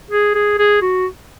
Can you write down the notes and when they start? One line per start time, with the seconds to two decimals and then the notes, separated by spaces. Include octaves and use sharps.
0.11 G#4
0.34 G#4
0.58 G#4
0.81 F#4